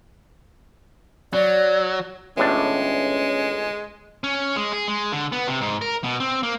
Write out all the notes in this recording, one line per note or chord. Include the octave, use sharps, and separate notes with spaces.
F#3 D5
G1 A2 G#3 C#4 D4
C#4
G#3
G#4
G#3
D3
B3
C3
G#2
A#4
B2
C4
A#3